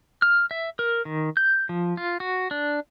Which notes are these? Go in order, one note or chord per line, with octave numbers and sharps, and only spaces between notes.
F6
E5
A#4
D#3
G6
F3
F4
F#4
D4